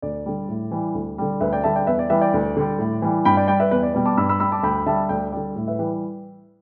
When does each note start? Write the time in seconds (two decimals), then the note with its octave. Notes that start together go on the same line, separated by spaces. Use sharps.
0.02 D2 D5
0.26 D3 G3
0.49 A2
0.71 E3 G3
0.95 D2
1.18 D3 G3
1.41 D2 B4 E5
1.53 D5 G5
1.64 D3 G3 E5 A5
1.76 D5 G5
1.87 E2 B4 E5
1.99 D5
2.10 E3 G3 B4 E5
2.21 D5 G5
2.34 D2
2.57 D3 G3
2.79 A2
3.02 E3 G3
3.25 G2 G5 B5
3.37 D5 G5
3.48 G3 D5 G5
3.60 B4 E5
3.71 E2 B4
3.83 D5
3.94 B2 G3 D5
4.05 A5 D6
4.17 G2 B5 E6
4.29 B5 E6
4.40 G3 B5 E6
4.52 A5 D6
4.63 D2 G5 B5
4.86 D3 G3 E5 A5
5.09 D2 D5 G5
5.32 D3 G3 D5
5.56 A2
5.67 B4 E5
5.79 E3 G3 B4